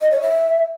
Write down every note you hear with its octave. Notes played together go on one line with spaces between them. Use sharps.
D#5
C#5
E5